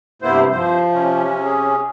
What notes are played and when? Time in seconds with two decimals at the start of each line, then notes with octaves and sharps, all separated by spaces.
0.22 G2 C3 A#3 B3 E4 C5
0.51 F3 C5
0.92 C3 C#4
1.42 G#4